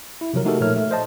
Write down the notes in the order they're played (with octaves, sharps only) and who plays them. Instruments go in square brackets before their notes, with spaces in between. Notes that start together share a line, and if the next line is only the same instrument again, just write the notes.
[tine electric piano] E4
C3 F3 F#3 A#4
A3 D#4 F#4 G4 A4 A#4
A#2 F3 A3 A#4 C#5 F6
A3
C5 D#5 A5